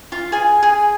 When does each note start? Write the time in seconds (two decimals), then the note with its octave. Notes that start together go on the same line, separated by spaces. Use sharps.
0.12 F4 F5
0.32 G#4 G#5
0.63 G#4 G#5